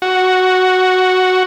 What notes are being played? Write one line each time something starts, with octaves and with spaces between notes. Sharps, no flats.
F#4